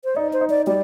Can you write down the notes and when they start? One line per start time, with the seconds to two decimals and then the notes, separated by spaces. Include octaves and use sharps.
0.05 C5
0.16 D#4 D5
0.33 C5
0.41 D#4
0.50 D5
0.67 G3 D5